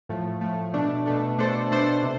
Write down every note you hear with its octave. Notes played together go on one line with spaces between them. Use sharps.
A2 F3 A3
A2 F3 A3
B2 A3 D4
B2 A3 D4
B2 A3 D4 A4 C5
B2 A3 D4 A4 C5
C3